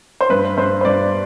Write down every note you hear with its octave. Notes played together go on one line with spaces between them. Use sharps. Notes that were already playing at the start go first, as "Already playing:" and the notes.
C5
G2 B4
G2 C5
C5
G2 D5